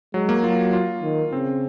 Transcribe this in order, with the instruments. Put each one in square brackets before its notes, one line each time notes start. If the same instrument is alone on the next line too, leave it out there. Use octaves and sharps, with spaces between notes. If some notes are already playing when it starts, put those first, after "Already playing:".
[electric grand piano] F#3 [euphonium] G#3
[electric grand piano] A#3
[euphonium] F#3 [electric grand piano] F4
[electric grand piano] F4
[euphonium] D#3
[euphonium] C#3 [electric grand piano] C4